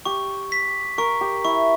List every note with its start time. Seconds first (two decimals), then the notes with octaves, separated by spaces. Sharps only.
0.05 G4 C#6
0.52 B6
0.98 A#4 C#6
1.21 G4
1.45 E4 C#6